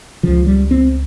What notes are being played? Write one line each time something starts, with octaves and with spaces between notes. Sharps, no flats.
C#2 C#3 F3
G3
C4